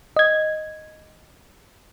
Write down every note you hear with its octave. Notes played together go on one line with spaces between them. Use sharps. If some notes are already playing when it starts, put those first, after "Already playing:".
D#5 G#6